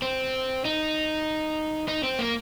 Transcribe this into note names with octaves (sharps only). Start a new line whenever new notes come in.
C4
D#4
D#4
C4
A#3